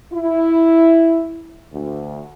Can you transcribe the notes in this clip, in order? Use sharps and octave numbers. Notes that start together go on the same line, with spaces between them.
E4
D2